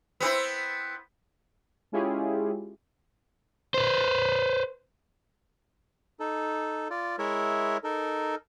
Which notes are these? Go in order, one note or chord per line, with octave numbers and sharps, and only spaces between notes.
B3 C4 E4
G#3 C#4 E4 F4 G4 G#4
B4 C5
D#4 A4
F4 D5
G#3 E4 A#4 C#5 E5
D#4 A4 A#4